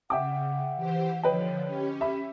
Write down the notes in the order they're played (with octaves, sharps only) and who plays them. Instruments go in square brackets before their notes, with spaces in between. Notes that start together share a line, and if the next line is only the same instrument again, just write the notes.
[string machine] C#3 [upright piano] E5 G5 D6 [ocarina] F#5
[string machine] E3 G4 C5
[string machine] D3 F3 [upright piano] B4 D#5 G5 [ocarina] C#5
[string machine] C#4 G4
[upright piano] E5 B5